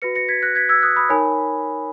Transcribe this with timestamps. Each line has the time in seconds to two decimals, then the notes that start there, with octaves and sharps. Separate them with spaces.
0.02 F#4 B4 A#6 C#7
0.15 A#6 C#7
0.28 G#6 B6
0.43 F#6 A#6
0.55 G#6 B6
0.69 E6 G#6
0.82 D#6 F#6
0.96 B5 D#6
1.09 D#4 A#4 C#5 G#5 B5